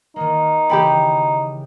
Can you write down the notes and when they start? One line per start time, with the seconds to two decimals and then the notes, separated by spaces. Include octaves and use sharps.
0.16 D#3 A#3 D#4
0.70 C#3 E3 G4 G5 B5 A6